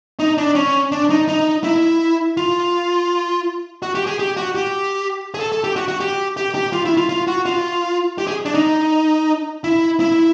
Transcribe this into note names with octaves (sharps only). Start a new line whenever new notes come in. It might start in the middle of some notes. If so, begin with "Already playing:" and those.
D#4
D4
C#4
D4
D#4
D#4
E4
F4
F#4
G4
G#4
G4
F#4
G4
G#4
A4
A4
G4
F#4
F#4
G4
G4
G4
F4
E4
F4
F4
F#4
F4
G4
G#4
D4
D#4
E4
E4